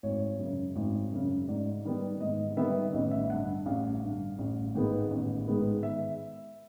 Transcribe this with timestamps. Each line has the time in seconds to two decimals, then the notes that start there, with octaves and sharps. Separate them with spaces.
0.03 G#1 C#5
0.39 F#2 C#3
0.76 G#1
1.12 F#2 C#3
1.48 G#2 D5
1.85 D#3 G3 B3
2.20 G#2 D#5
2.57 D#3 G3 B3 E5
2.93 A1 D#5
3.11 E5
3.30 G2 D3 F#5
3.66 A1 F5
4.02 G2 D3
4.39 A1
4.75 G#2 D#3 G#3 B3
5.11 A1
5.47 G#2 D#3 G#3 B3
5.83 E5